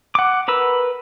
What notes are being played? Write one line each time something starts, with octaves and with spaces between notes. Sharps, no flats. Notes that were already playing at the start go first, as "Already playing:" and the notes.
F#5 D6
A#4 B4 E6